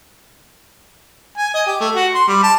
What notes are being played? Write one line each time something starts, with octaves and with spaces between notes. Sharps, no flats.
G#5
D#5
G4
A3
F#4
C6
G3
A5